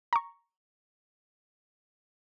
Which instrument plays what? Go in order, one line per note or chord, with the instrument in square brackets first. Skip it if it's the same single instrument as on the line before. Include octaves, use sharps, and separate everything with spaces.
[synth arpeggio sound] A#5 C#6